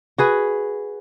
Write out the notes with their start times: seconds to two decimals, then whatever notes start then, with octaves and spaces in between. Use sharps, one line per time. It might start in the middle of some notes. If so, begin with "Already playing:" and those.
0.18 F#4 G#4 B4